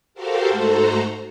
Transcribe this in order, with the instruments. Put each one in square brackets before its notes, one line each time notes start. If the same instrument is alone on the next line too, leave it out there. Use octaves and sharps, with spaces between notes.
[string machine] F#4 G4 A4 A#4 C5 F5
G#2 A3 F#4 A4 C5 A#5